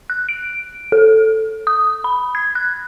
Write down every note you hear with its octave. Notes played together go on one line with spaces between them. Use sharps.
F#6
D7
A4
D#6
B5
G#6
F#6